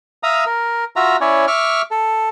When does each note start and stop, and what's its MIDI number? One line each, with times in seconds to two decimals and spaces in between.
0.23 0.44 76
0.23 0.44 77
0.23 0.44 82
0.23 0.44 87
0.46 0.84 70
0.96 1.16 65
0.96 1.16 66
0.96 1.16 76
0.96 1.16 82
1.21 1.46 61
1.21 1.46 64
1.21 1.46 73
1.21 1.46 74
1.47 1.82 76
1.47 1.82 85
1.47 1.82 86
1.47 1.82 89
1.91 2.29 69